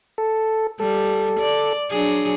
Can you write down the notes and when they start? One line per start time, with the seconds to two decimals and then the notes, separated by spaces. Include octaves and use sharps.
0.18 A4
0.80 G3 A4
1.40 D5
1.90 F#3 D4 G#4